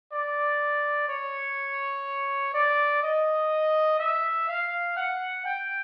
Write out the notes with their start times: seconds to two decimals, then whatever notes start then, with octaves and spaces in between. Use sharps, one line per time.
0.12 D5
1.08 C#5
2.54 D5
3.03 D#5
3.99 E5
4.48 F5
4.97 F#5
5.45 G5